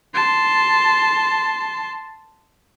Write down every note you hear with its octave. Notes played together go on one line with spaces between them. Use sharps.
A5 C6